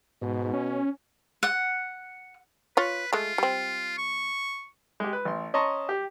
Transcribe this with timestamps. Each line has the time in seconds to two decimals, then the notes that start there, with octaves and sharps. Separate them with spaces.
0.21 G#2 B2
0.53 C#4
1.43 F#5
2.77 F4 B4 C#5
3.13 G#3 A3 F4
3.38 G3 C4
3.98 C#6
5.00 G#3 G4
5.13 B4
5.25 A1 C6
5.54 C#4 D#5 A5 A#5 C6 C#6
5.89 G4